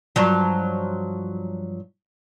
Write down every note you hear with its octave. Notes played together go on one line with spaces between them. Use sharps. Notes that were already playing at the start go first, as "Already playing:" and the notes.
G2 F3 F#3